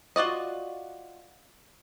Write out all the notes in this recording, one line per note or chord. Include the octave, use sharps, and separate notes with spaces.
F4 F#4 D5 D#5